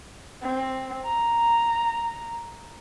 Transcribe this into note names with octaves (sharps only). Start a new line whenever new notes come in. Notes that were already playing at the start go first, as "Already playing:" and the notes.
C4
A#5